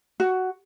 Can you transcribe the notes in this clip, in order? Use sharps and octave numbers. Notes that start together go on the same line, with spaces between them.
F#4